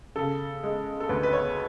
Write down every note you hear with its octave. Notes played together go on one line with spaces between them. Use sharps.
C#3 A4
G#3
A4
D2 B4
B4
C#5